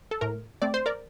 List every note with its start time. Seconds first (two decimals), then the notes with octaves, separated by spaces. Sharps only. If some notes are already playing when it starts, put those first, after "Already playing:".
0.11 A4
0.21 A2 A#4
0.62 A3 C4 D5
0.74 C5
0.86 A#4 D5